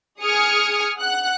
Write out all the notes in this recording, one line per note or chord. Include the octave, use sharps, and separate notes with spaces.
G#4 D#6 F6 G#6 C#7
F#5 F#6